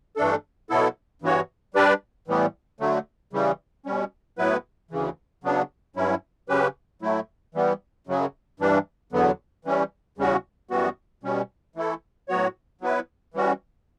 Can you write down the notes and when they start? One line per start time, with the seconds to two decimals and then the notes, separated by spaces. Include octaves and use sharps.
0.16 G2 E3 A3 D4 A4
0.70 B2 F#3 B3 E4 A4
1.22 G2 E3 B3 F#4 C#5
1.74 G3 D4 G4 B4 D5
2.28 A2 E3 G3 B3
2.80 D3 F#3 A3
3.33 C#3 E3 G3
3.86 B2 G3 C#4
4.38 A2 F#3 B3 E4 B4
4.91 D2 C#3 E3
5.44 C#3 F#3 B3 D4
5.96 G2 F#3 C#4 E4
6.49 C#3 F#3 C#4 G4 B4
7.02 A2 F#3 A3 E4
7.55 E3 G3 B3
8.07 F#2 C#3 F#3
8.60 G2 E3 G3 D4
9.12 E2 D3 F#3 B3
9.65 E3 G3 C#4
10.18 E2 C#3 G3 C#4 F#4
10.70 F#2 E3 G3 B3 F#4
11.23 B2 G3 C#4
11.76 E3 A3 E4 A4
12.29 A2 F#3 B3 F#4 C#5
12.81 F#3 B3 E4 B4
13.34 E3 G3 C#4 F#4